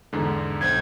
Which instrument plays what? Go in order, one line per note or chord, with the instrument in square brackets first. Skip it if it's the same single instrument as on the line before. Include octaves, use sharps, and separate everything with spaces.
[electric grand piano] E2 G#2 D3
[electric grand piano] B1 C5 G6 [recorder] G#6